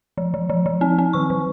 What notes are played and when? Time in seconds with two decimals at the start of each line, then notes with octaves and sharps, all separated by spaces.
0.17 F3
0.34 F3
0.50 F3
0.66 F3
0.81 C4
0.98 C4
1.13 D#3 C#6
1.30 D#3